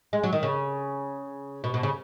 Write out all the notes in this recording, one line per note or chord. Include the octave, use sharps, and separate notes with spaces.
G#3
F#3
D#3
C#3
B2
B2
C#3